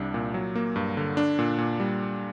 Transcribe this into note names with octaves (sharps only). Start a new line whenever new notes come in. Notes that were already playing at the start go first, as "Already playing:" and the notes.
Already playing: C2 G3 D4
A#2
F#3
A#3
G2
D3
D4
A#2
A#2
G3